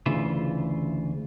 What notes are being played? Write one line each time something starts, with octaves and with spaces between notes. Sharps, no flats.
D2 C#3 E3 F4 E5